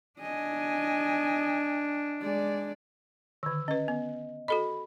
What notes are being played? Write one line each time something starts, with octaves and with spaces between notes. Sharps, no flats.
D4 D#5 G#5
G#3 D5
D3 D#3 E6
C#4 B4 D#5
B3
F#4 A4 D#5 B5